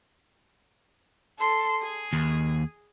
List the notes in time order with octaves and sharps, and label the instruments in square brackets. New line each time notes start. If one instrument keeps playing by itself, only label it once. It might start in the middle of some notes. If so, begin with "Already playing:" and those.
[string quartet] A4 C6
G#4
[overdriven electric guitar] D#2